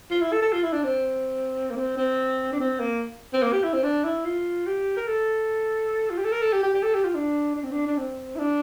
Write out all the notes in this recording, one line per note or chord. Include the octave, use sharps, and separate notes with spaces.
F4
E4
A4
A4
F4
E4
D4
C4
A#3
C4
C4
D4
C4
A#3
C4
A#3
G4
E4
C4
D4
E4
F4
G4
A#4
A4
F4
G4
A4
A#4
A4
G4
G4
G4
A4
G4
F4
D4
D4
C4
D4
D4
C4
E4
D4